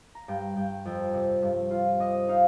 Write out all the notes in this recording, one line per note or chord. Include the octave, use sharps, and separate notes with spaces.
A#5
G2 G5
G2 G5
F2 G5
C3
G2
F4
C3 D#5
D#4 F5